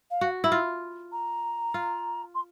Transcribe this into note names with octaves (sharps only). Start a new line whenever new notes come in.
F5
F#4
E4
F4
A#5
F4
C6